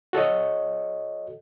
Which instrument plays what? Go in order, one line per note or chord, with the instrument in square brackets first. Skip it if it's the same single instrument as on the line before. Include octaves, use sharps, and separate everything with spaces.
[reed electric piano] F#4 A4 C#5 D#5